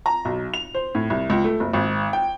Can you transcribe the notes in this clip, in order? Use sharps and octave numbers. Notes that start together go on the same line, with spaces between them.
A#5
B1
F7
C5
A2
C2
C#2
A3
F#1
G#1
G5